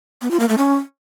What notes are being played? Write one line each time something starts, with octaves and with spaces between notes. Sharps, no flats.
B3
F4
A#3
A3
C#4